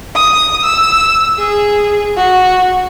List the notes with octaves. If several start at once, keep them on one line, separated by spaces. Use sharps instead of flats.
D#6
E6
G#4
F#4